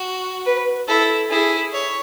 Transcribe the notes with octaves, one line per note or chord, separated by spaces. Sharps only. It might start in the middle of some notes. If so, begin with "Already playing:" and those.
Already playing: F#4
B4
E4 A4
E4 G#4
C#5